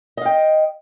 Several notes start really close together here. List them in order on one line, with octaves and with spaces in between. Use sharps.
D#5 F5 G5